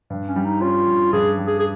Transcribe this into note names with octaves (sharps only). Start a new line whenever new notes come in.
G2
C#4
G3
D#4
C#4 F4
G2
G2 G#4
G3
G#4
G#4